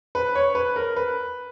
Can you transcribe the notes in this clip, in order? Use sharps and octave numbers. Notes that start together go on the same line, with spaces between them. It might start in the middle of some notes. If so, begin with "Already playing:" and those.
B4
C#5
B4
A#4
B4